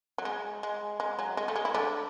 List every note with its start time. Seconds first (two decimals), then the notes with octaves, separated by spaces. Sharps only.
0.18 F#3
0.25 G#3
0.63 G#3
1.00 G#3
1.19 F#3
1.37 G#3
1.48 A3
1.56 G#3
1.65 E4
1.74 D3 D4